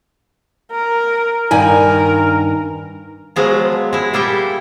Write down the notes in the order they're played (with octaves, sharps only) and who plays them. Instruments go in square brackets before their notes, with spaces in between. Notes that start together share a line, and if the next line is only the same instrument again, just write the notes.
[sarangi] A#4
[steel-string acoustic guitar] G2 D#3 G#5 [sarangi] A#4
[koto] F3 F#3 G#3 B3
G#3 E4
A#2 G3 E4 G#4 G5